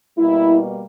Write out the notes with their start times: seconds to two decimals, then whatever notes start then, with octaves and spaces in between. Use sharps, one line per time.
0.19 B2 G3 A#3 E4